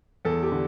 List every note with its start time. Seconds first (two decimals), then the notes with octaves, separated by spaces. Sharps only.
0.25 E2 A4
0.43 G4
0.52 D3